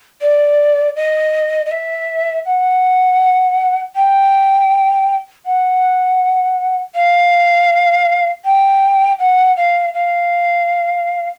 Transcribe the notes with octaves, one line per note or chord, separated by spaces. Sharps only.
D5
D#5
D#5
E5
F#5
G5
F#5
F5
G5
F#5
F5
F5